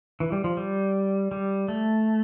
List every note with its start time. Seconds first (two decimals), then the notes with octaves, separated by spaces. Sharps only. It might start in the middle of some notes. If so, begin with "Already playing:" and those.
0.20 E3
0.32 G3
0.44 F3
0.57 G3
1.32 G3
1.68 A3